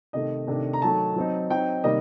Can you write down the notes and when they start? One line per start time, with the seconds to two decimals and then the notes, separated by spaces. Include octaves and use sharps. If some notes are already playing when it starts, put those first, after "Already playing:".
0.13 C3 D#3 A3 D#5
0.47 C3 D#3 A3 D4
0.73 A#5
0.82 D#3 F#3 A3 A5
1.15 F#3 C4 D#4
1.50 F#3 C4 D#4 G5
1.84 C3 D#3 G3 A#3 D#5